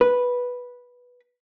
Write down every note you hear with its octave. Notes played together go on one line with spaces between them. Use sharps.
B4